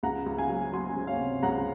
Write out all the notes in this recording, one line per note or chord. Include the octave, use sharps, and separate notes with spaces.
C#2 F#5 A#5
C#2
F5 G#5
F#3
F#3 G#5 C6
C#2
C#5 F5
C3
C#2 F#5 A#5